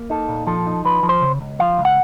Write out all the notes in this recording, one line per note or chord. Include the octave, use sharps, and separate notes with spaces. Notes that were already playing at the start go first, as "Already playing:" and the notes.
Already playing: A#3
D#4 A4
A#2
F3 A4
D#4
F3 B4
F3
C5
C#3
C#2
F3 F5
C#2
F#5